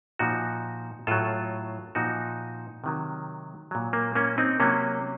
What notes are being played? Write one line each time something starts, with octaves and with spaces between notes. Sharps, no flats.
A#2 F3 D#4 F#4
A2 F#3 F4 A4
A#2 F3 D#4 F#4
C3 D#3 F#3
A#2 F#3
A#3
A#3 C#4
C4 D#4
C3 F#3 A#3 C#4